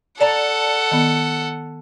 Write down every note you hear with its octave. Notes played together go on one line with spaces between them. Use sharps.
A4 D5 F#5 A5 A#5
D#3 B3